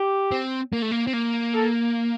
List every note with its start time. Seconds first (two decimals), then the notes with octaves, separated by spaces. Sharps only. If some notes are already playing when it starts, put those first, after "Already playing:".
Already playing: G4
0.31 C4
0.73 A#3
0.82 A3
0.91 A#3
1.07 C4
1.14 A#3
1.54 A4